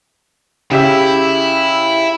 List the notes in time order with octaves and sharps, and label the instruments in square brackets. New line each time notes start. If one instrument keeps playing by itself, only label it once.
[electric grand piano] C#3 G4 E5 [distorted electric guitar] E4